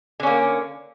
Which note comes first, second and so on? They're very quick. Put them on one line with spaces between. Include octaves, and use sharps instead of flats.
D3 C#4 A#3